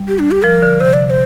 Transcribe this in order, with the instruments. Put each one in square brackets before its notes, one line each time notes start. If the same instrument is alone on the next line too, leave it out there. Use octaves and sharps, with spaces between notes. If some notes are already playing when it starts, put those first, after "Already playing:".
Already playing: [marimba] G3
[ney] G4
D4
G4
[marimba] F3 [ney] A#4
[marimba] D3
[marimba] C3 [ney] C5
[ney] D5
D5
C5